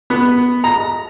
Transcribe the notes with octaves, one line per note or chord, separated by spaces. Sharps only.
B3
A#5